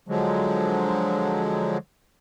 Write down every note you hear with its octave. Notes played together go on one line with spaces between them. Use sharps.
D3 F3 F#3 G#3